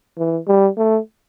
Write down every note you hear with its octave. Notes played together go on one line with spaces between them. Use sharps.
E3
G3
A3